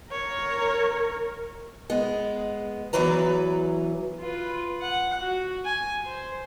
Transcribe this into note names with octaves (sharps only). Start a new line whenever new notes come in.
A#4 C#5
G#3 B3
E2 C#3 E3 F#3 B4 A#5
F4 B4
F#5
F#4
G#5
C5